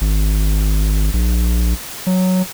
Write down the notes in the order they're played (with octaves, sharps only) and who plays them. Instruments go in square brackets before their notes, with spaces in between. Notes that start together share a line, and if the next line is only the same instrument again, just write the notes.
[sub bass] G#1
A#1
F#3